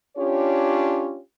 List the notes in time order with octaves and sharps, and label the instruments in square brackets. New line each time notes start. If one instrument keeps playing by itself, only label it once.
[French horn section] C#4 D4 F4 G4 C#5